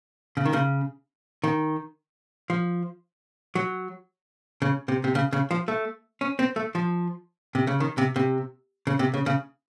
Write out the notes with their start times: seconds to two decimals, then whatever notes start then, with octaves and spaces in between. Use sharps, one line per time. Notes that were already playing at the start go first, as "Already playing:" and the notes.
0.37 C#3
0.45 D#3
0.53 C#3
1.44 D#3
2.50 F3
3.55 F#3
4.62 C#3
4.88 C3
5.04 C3
5.15 C#3
5.33 C#3
5.51 F3
5.68 A3
6.21 C#4
6.39 C4
6.56 A3
6.75 F3
7.55 C3
7.67 C#3
7.80 D#3
7.98 C3
8.16 C3
8.87 C#3
8.99 C3
9.14 C#3
9.26 C#3